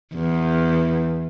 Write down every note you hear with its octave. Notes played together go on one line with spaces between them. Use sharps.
E2